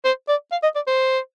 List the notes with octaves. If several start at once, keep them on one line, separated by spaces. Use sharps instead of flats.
C5
D5
F5
D#5
D5
C5